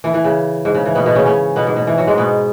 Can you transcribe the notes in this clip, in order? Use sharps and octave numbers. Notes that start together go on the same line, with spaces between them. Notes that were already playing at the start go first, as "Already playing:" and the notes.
E3
E3
C#3
G#2
C#3
E3
B2 B3
B2 B3
C#3 C#4
C#3 C#4
B2 B3
G#2
B2
E3
F#3
G#2 G#3
B2 B3